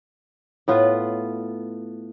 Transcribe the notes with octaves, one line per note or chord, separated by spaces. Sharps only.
A2 B3 F4 B4